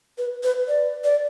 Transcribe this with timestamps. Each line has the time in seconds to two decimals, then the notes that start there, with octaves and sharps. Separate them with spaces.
0.18 B4
0.43 B4
0.68 D5
1.04 D5